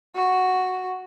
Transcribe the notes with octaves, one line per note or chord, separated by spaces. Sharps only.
F#4